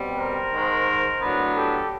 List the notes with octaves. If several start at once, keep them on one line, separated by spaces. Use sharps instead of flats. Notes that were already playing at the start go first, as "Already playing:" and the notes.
Already playing: B2 G3 C4
A#4 C5
G#2 D#3 G#3
A2 F#3 B3 D4
G4 A4